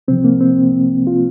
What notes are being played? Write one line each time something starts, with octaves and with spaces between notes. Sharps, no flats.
C2 C3 F3 C4
A#3
C4
F4